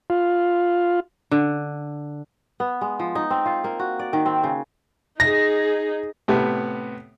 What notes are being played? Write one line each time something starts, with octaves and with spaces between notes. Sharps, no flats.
F4
D3
B3
G#3
F3
D#4
C4
F4
A#3
F#4
D5
D#3
C4
C#3
D#4 G#4 A#6
A2 C3 B3